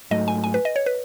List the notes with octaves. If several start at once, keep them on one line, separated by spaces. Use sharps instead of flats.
G#2 F#3 A3 D#5
G#5
G#5
B4
D#5
C#5
B4